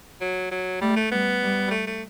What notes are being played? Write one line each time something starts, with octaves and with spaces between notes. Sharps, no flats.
F#3
F#3
G3 A3
A3
G3 B3
G3
G3
A3
A3